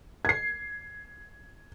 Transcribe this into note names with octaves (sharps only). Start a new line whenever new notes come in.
G#6 C7